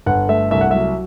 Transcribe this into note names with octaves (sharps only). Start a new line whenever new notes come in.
G1 F#5
A3 E5
C2 E5
F#5
F#3 E5